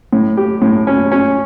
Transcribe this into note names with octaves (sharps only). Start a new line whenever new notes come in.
A2
G4
A2
C#4
C#4